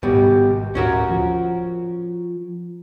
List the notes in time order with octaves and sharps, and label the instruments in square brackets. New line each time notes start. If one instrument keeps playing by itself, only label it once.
[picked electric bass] D1 G#1 [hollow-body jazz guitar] B2 G3
[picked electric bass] D1 [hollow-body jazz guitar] C#4 F#4 A#4
[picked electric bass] F3